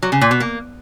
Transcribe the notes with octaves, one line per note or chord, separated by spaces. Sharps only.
F#3
C#3
A#2
B2
A#3